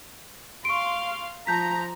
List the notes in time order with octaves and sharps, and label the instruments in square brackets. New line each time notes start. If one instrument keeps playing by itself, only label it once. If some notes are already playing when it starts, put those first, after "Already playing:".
[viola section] F5 C6 [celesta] C#6 D7
[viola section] F3 A#5 [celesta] A5 G6 B6